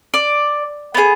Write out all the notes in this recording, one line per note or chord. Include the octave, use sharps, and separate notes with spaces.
D5
B3 D#4 G#4